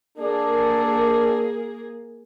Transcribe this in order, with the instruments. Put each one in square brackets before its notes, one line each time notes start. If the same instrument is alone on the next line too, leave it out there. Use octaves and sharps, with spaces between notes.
[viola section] A#3 G#4 [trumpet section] D4 A4 D5